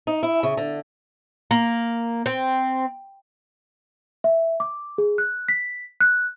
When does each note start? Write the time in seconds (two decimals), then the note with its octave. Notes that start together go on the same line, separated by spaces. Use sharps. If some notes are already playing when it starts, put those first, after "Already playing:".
0.07 D#4
0.23 E4
0.43 C#3
0.57 D3
1.51 A#3
2.26 C4
4.24 E5
4.60 D6
4.98 G#4
5.18 F#6
5.49 B6
6.00 F#6